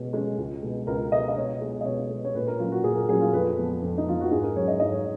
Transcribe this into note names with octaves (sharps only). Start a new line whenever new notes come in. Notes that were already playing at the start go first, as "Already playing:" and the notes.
Already playing: B2 G#3 C#4
G#3 C#4
C#2
B2 G#3
C#2 A#4
B2 G#3 D#5
D#5
B2 C#5
G#3 B3
D#5
B2 C#5
G#3 B3
C#5
A#2 B4
A#4
F#3 C#4 F4
F#4
A#2 G#4
A#4
F#3 C#4 G#4
F4
F2 B4
F3 B3
F2
D#4
F3 B3 F4
F#4
G#2 G#4
A#4
F#3 C#4 C#5
D#5
G#2 D#5
C#5